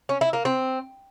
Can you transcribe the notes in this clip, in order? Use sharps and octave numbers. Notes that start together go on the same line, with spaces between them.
C#4
E4
A#3
C4